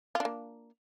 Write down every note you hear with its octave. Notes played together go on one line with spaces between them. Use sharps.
A#3 D4 F4